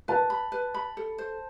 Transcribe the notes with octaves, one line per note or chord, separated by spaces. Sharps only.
B4 A5
B5
B4
B5
A4
C5